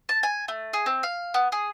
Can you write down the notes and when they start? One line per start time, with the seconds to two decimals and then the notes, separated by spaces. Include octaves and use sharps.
0.09 A5
0.23 G#5
0.48 A3
0.73 G#4
0.86 C4
1.03 F5
1.34 B3
1.52 G#4